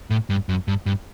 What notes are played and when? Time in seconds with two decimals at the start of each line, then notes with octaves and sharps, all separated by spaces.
0.10 A2
0.30 G2
0.49 F#2
0.68 G2
0.86 G2